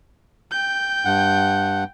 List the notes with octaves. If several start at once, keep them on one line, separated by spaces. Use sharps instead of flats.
G5 G6
G2 F#5